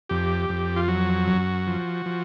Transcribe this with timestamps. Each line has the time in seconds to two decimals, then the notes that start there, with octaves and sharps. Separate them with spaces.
0.09 F2 G4
0.49 F2
0.76 F4
0.88 F#3 F#4
1.27 F#2
1.67 F3
2.06 F3